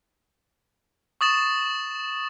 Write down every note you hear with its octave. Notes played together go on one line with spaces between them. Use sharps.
C#6 D#6 A6 E7